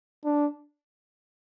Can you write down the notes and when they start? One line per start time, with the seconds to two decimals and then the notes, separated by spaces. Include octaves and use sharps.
0.25 D4